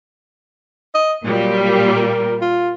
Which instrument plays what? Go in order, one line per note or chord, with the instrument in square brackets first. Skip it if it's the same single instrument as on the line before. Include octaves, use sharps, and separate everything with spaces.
[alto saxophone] D#5
[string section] A#2 G3 [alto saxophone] F#3
[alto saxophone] A#4
F4